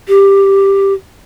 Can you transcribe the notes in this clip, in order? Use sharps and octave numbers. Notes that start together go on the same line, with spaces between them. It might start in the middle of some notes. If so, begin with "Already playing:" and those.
G4